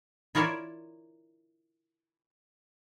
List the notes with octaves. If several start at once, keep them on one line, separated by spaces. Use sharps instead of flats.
E4 F4 A#4 C#5 D5 E5